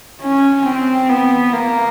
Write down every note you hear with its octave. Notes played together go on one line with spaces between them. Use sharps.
C#4
C4
B3
A#3